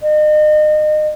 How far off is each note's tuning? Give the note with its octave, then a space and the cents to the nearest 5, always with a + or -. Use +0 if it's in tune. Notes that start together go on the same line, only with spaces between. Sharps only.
D#5 -35